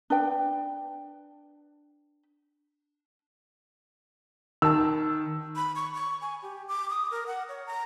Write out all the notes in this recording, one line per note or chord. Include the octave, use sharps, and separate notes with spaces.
D4 B4 G5
D#3 A5 E6
B5
C#6
C#6
G#5
G4
D6
D#6
A#4
F#5
C#5
A#5